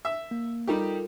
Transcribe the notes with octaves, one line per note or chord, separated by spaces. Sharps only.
E5
A#3
G3 D#4 F4 G4 A4 A#4